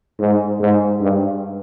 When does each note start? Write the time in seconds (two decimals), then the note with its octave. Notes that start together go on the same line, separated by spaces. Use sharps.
0.19 G#2
0.60 G#2
1.01 G2